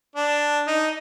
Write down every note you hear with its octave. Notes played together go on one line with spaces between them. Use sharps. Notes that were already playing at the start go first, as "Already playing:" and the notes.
D4
D#4